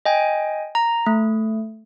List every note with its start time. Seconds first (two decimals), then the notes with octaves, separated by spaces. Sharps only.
0.05 D#5 G5 G#5
0.75 A#5
1.06 A3